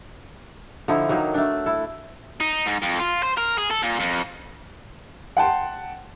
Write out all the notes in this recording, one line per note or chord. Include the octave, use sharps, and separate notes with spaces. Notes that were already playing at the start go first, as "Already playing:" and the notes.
D3 F3 D#4 E4
D#3 F#3 A#3 D#4
A3 D4
E4 A4
D#4
G#2
F2
F4
C5
A#4
G#4
A4
A#2
F2
F#5 G5 A5 C6